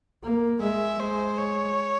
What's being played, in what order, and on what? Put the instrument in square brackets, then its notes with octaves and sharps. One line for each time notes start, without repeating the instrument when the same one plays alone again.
[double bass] A#3
[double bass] G#3 [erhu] E5
[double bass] G#3 [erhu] C5
[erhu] C#5